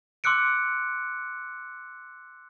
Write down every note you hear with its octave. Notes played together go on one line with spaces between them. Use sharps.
C6 D6 E6 F#6 C#7 D7